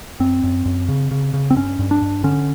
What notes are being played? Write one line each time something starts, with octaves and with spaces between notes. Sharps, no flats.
F#2 C4
F#2
F#2
C#3
C#3
C#3
C4
G2 C#4
G2
D4
G2
D3 C#4